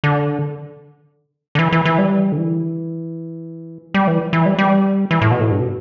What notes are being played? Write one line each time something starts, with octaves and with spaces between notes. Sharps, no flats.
D3
D3
E3
E3
E3
G3
D3
E3
G3
E3
E3
G3
G3
E3
A2
B2
A2
G2
B2